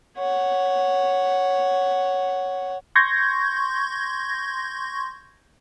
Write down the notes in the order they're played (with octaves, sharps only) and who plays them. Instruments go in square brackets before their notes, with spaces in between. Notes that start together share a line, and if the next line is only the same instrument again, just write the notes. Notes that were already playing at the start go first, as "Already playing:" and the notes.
[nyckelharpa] C#5 F#5
[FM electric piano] C6 C#6 G6 G#6 A#6